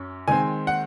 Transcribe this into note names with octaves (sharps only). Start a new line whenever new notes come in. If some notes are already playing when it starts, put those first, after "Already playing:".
Already playing: F#2 C#4
D#3 G#3 C4 G#5
F#5